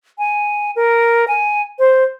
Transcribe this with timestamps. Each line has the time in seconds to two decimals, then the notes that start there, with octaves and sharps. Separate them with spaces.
0.18 G#5
0.76 A#4
1.28 G#5
1.79 C5